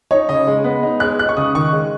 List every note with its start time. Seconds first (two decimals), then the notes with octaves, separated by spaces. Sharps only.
0.11 D#4 C#5
0.29 C#3 D#5
0.47 G#3
0.64 B3
0.83 D#4
1.00 G#3 F#6
1.19 D#4 F#6
1.29 C#6
1.37 C#3 D#6
1.55 D#3 C#6
1.73 G#3